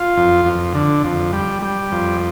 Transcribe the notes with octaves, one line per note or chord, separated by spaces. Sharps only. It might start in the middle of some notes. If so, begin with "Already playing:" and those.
Already playing: F4
F2
F2
D3
F2
G3
G3
F2